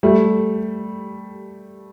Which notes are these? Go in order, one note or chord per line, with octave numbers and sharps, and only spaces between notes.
G3 A3